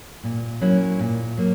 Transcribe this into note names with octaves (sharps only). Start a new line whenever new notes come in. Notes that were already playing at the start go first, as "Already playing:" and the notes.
A#2
F#3 A#3 C#4 E4
A#2
F#3 A#3